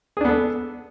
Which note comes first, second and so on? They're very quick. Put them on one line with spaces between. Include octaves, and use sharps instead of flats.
G#4 D4 B3 A4